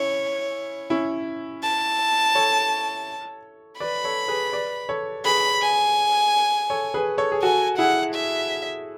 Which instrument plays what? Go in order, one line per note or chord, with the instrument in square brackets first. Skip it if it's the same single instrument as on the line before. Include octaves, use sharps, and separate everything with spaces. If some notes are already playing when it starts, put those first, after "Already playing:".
Already playing: [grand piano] C#4 E4 [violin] C#5
[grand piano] C#4 E4
[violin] A5
[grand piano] A4 C#5
[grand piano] B4 D5 [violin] B5
[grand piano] A4 C#5
G#4 B4
B4 D5
A4 C#5
[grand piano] G#4 B4 [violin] B5
[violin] G#5
[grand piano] A4 C#5
G#4 B4
A4 C#5
G#4
[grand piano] F#4 A4 [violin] G#5
[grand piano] E4 G#4 [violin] F#5
[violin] E5